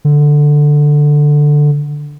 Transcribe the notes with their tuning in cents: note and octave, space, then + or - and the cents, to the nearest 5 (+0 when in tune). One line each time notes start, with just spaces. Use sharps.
D3 +5